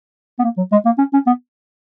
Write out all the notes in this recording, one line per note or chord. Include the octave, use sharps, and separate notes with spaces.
B3
A#3
F#3
G#3
A#3
C#4
C#4
B3